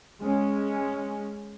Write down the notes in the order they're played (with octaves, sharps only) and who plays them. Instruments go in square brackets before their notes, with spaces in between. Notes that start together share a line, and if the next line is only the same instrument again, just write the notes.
[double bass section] G#3 C#4